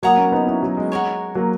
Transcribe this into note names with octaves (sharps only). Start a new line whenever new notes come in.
F#3 A#3 C#5 F#5 A#5 D#6
A#3 C#4
B3 D#4
C#4 E4
F#3
G#3
F#4 A#4 C#5
F#3 A#3